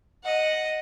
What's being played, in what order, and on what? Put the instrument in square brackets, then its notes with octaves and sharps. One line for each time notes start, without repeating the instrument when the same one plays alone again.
[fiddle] D#5 F#5